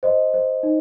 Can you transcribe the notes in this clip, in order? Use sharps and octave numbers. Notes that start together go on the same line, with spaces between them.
C5 D#5
C5
D#4